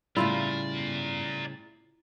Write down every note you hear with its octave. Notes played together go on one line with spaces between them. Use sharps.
A2 C#3 G3 E4 F4 D5 A#5